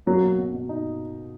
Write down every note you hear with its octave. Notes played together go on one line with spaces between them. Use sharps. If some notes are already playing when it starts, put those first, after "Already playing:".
F#3 A#3
B2
B2
B2
D#4